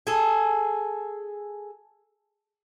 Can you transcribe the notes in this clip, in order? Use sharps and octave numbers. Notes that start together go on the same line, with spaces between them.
G#4 A4